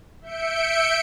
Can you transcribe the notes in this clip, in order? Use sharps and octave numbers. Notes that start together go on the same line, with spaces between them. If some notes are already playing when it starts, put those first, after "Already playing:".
E5 G6 C#7 D7